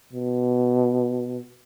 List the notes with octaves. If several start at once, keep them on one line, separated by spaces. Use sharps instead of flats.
B2